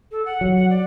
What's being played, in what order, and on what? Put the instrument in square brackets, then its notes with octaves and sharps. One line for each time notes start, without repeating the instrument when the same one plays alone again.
[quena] A4
F#5
[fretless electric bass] F#3
[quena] F#5
D5